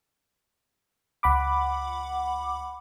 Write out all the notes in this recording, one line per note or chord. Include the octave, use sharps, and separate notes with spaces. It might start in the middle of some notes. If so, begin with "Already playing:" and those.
C#2 F#5 B5 D6